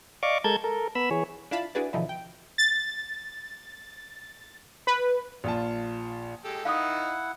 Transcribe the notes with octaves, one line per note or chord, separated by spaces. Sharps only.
D5 D#5 F5 C#6 D6
G#3 A4 A#4 A5 G6 G#6
A4 A#4
B3 B5 E6
E3 G#4 C#5
D4 E4 F4 F5 A5 B5
D4 E4 F#4 G#4 B4 D5
B2 D3 E3 F3 D#4 E4
G5
A6
B4
A#1 F4 A5
G#3 G4 A4
D#3 D#4 E4 F5 F#5 D#6